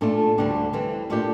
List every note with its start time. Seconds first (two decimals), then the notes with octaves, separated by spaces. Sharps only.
0.01 A#2 A3 D4 F4 A4
0.38 D2 D3 G3 D4
0.73 E3 G3 C4
1.10 A#2 A3 D4 G4